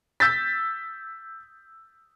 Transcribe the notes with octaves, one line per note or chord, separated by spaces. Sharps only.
E6 G6 A6 B6